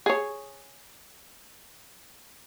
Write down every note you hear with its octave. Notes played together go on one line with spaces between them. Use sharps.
G#4 C#5